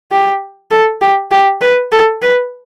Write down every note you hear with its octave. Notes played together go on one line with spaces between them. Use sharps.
G4
A4
G4
G4
B4
A4
B4